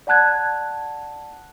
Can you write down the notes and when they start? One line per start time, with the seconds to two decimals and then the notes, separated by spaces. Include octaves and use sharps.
0.07 D5 F#5 A5 F#6 G#6